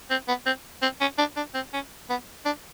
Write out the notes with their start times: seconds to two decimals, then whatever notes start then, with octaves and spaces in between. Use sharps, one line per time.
0.10 C4
0.28 B3
0.46 C4
0.82 C4
1.01 C#4
1.18 D4
1.37 D4
1.54 C4
1.73 C#4
2.10 B3
2.45 D4